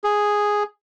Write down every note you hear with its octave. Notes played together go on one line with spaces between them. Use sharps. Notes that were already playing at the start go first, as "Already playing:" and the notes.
G#4